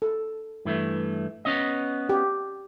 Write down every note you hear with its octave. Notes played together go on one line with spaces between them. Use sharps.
A4
G2 E3 A3
B3 C#4 D#5
G4